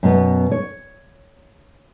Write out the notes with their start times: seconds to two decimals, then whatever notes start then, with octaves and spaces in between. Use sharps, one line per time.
0.03 F#2 B2 B3
0.51 C#5